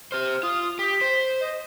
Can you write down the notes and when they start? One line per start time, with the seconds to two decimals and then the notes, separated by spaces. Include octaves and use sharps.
0.12 G4 C5 F6
0.43 F4 D#6
0.79 G4 B6
1.01 C5
1.40 D#5